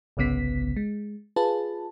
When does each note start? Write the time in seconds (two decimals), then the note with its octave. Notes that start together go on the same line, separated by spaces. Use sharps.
0.17 G1 C2 C#3 B3 B6
0.76 G#3
1.36 F4 G#4 B4 A5